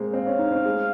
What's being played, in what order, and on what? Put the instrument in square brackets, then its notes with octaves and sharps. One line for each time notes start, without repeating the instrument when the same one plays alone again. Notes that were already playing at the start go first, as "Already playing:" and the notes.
Already playing: [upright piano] G#3 A#3 C4
[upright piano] C4 [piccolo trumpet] F5
[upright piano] C#4
D#4
C4
G#3